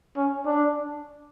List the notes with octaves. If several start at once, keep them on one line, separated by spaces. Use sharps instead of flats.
C#4
D4